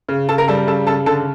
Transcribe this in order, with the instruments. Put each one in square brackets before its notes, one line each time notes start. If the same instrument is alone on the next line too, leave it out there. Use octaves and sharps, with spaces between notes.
[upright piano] C#3
C#3 A4 A5
A#4 A#5
G3 A4 A5
C#3 A4 A5
C#3 A4 A5
D3 A4 A5